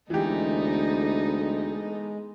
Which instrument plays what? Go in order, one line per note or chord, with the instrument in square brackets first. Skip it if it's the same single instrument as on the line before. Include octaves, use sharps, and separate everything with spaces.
[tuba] D2 [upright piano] E3 G4 [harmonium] G#3 [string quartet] B3 D#4 A4